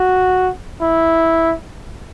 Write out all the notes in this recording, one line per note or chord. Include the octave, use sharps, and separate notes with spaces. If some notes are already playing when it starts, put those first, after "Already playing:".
Already playing: F#4
E4